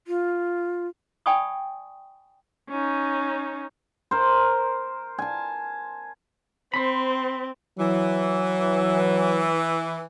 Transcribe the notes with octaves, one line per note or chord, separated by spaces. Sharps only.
F4
D5 G5 G#5 B5 C#6 D#6
C#4 D#4
A#4 C5
G#5 A5
C4 C5 B5
E3 F#3